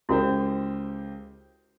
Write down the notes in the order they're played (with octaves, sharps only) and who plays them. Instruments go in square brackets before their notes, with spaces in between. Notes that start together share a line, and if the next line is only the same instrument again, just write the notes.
[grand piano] C#2 G4 C5 [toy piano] E4 F#4 A#4